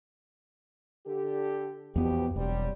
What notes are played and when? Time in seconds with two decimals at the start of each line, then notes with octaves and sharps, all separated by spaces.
1.07 D3 G4 A4
1.96 E2 B2 F3 B3 G4
2.36 E1 F#3 G3 C4